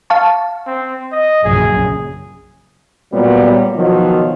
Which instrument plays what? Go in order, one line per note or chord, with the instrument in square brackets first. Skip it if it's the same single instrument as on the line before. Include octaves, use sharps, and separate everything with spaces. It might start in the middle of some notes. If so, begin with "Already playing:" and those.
[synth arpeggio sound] F5 A5 C#6
[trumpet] C4
D#5
[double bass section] A#1 F#2 C#3 [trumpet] G#4
[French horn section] A#2 F#3 G3 B3
B2 D#3 F3 F#3